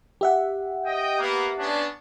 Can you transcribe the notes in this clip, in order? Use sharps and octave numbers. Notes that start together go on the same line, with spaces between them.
G4 E5 F#5
D#5 G5
A#3 B3
B3 C#4 D4